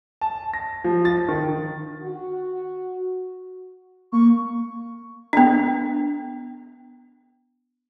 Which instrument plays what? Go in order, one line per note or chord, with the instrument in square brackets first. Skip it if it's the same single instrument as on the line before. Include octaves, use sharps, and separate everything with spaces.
[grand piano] A5
A#6
F3
A6
D#3
[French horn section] F#4
[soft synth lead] A#3 [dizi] C#6
[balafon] B3 D4